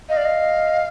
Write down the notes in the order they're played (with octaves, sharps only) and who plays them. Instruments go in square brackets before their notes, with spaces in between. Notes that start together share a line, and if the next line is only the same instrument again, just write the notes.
[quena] D#5 [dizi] F5
[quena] D5
D#5